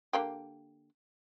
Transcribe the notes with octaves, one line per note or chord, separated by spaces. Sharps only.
D3 A#3 G4